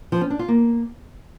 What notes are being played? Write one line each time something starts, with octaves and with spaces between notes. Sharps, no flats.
F3
C#4
D4
F4
A#3